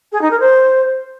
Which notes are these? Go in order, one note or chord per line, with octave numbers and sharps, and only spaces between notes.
G#4
D#4
A#4
C5